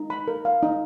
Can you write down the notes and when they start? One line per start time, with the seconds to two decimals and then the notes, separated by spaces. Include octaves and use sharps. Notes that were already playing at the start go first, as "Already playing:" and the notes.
Already playing: D#4
0.10 B5
0.28 A#4
0.45 F5
0.63 D#4